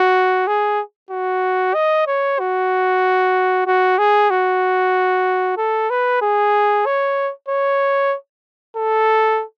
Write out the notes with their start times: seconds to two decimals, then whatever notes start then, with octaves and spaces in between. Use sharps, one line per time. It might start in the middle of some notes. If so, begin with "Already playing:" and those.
Already playing: F#4
0.48 G#4
1.11 F#4
1.75 D#5
2.07 C#5
2.40 F#4
3.67 F#4
3.98 G#4
4.30 F#4
5.57 A4
5.90 B4
6.22 G#4
6.86 C#5
7.49 C#5
8.77 A4